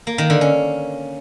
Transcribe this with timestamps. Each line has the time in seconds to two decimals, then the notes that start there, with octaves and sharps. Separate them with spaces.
0.07 A#3
0.18 D#3
0.30 D3
0.41 C#4